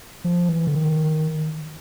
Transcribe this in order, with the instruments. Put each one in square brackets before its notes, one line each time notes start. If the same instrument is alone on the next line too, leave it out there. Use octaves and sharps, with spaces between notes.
[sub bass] F3
E3
D3
D#3